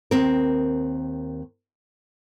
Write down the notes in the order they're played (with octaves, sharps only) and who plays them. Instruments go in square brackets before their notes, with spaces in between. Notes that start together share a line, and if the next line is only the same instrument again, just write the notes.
[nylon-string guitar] D#2 C4 A#4